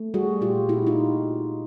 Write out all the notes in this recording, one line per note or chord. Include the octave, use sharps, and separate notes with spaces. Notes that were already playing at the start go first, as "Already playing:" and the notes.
Already playing: A3
G3 F#4 G#4
A#2 F4 G4
A#2 E4 F#4
D#4 F4